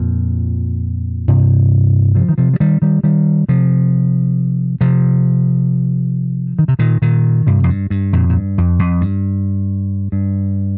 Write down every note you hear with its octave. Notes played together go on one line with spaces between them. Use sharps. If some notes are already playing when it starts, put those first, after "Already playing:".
Already playing: F2 A#2
G2 C3
C3 F3
D#3
C3 F3
F3
D#3 G3
D#3 G3
D#3 G3
C3 F3
C3 F3
D#3
C3
A#2 D#3
A#2 D#3
G2 C3
F2
G2
G2
F2 A#2
A#2
G2
F2
F2
G2
G2